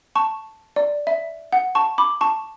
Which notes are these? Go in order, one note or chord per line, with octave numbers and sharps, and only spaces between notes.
A5 C#6
D5
E5
F#5
A5 C#6
B5 D6
A5 C#6